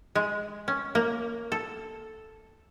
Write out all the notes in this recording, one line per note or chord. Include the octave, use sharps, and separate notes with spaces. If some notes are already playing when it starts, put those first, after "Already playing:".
G#3
C#4
A#3
A4